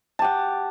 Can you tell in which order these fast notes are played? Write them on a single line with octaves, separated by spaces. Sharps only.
A5 G4 F#5